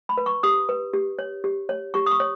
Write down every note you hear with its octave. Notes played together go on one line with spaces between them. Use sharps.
B5
B4
C#6
G4 D#6
B4
G4
C#5
G4
C#5
G4 C#6
D#6
C#6
C#5